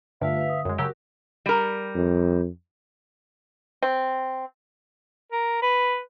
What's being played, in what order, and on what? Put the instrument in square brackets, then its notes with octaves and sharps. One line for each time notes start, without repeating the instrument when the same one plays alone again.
[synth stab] G2 [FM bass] D3 [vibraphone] A3 F4 F5 [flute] E5
[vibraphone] B4 F5
D#6
[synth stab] F#2 G#3
[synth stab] C#3 F#3 G4 [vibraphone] F#4 A#4 [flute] E6
[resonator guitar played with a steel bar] G3 A#4
[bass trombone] F2
[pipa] C4
[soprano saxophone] A#4
B4